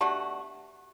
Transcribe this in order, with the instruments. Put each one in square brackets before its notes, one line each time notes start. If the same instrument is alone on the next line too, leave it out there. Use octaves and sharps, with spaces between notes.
[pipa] B2 A3 D4 F#4 [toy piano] G4